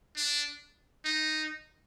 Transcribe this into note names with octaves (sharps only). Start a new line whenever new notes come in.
D4
D#4